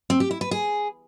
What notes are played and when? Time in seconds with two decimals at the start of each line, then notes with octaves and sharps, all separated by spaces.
0.10 C4
0.20 G4
0.31 E4
0.41 B4
0.51 G#4